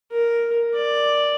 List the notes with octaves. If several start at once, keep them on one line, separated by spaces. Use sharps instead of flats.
A#4
D5